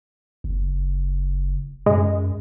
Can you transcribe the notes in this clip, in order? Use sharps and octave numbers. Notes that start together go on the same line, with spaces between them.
F#1
F#2 G#3